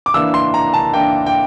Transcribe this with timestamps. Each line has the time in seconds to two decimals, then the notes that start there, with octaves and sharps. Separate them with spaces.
0.06 D6
0.14 E3 A#3 D4 E6
0.34 C6
0.54 A#5
0.74 A5
0.94 E3 A#3 D4 G5
1.26 G5